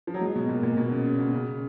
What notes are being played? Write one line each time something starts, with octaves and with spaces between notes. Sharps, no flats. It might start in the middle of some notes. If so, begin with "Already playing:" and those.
F3
F#3
G#3
B2
A#2
A#2
B2
C#3
C#3
B2
C#3